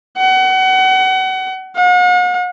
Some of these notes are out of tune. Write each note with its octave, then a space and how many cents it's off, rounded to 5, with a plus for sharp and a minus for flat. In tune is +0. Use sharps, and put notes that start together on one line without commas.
F#5 +30
F#5 -45